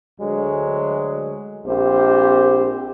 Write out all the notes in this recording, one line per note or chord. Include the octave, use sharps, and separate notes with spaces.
D2 D3 F#3 G#3
A#1 C4 G4 C5